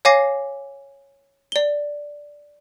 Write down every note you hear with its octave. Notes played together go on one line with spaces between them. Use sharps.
C#5 F5 G#5 D6 A#6 C7
D5 G7